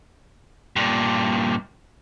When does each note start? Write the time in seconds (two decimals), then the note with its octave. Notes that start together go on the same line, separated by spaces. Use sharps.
0.76 G2 A#2